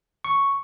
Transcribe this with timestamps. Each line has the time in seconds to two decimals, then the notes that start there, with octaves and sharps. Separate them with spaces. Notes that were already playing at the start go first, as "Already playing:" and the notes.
0.24 C#6